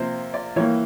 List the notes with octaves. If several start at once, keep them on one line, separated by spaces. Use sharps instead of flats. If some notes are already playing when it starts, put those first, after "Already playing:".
Already playing: C3 F3 A#3 C5
D5
E3 G3 A#3 C#5